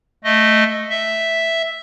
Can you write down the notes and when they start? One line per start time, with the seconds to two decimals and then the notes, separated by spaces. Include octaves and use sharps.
0.24 A3 D#5
0.90 E5